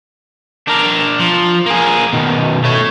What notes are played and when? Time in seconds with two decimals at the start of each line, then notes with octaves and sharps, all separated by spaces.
0.68 D4 A#4
1.19 F3
1.66 A#3 G#4
2.13 B2 D#3
2.64 A3 C#5